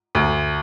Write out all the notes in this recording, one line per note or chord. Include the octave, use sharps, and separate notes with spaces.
D2